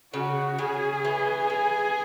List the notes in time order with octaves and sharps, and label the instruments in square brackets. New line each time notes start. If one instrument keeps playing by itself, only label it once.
[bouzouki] C#3 [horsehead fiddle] F#4
[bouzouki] C#3 [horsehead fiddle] G#4
[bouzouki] E3
E3